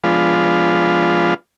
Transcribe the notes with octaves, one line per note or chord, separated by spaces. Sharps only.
F3 G#3 B3 D4 F4